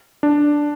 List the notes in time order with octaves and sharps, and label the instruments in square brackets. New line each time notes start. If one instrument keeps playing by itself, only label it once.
[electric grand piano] D4